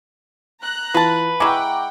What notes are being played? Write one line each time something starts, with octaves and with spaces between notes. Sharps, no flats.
A#5 F#6
E3 F4 B4 A5
G#3 E4 F#5 G5 A#5 C#6 D6